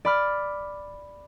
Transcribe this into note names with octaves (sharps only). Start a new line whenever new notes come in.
D5 B5 F6